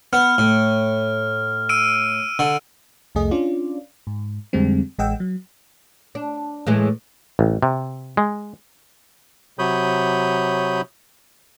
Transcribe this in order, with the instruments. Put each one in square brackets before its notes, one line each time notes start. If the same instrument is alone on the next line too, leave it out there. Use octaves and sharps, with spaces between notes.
[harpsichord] B3 [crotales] F6
[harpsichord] A2
[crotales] E6 D7 D#7
[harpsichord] D3 [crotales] E6
[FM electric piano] C2 F2 A3 G#4 D#5
C#4 D4 F4 D5
G#2
F2 D3 G3 G#3 C4
A1 G#3 D#5 F#5 G5 E6
F#3
[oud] D4
A2 E3 G#3
[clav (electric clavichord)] A1
C3
G#3
[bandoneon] C3 F#3 C#5 B5 D#6 G6